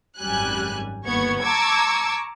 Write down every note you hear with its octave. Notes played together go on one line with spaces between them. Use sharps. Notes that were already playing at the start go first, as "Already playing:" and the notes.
G#1 F#2 G3 G#5 F#6
G1 D#2 B3 C#6 G#6
A5 A#5 C#6 D6 E6 G#6